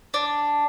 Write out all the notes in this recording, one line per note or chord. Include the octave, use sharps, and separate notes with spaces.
D4